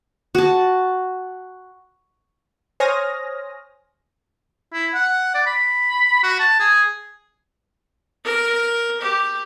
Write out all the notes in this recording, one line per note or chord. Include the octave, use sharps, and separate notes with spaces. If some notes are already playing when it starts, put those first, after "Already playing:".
F#4 A5
C5 C#5 G#5 D#6 F6 A#6
E4
F#5
D5
B5
F#4
A5
G#4
A#4
G4